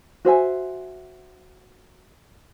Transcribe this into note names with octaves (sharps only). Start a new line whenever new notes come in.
F#4 C5 E5 G#5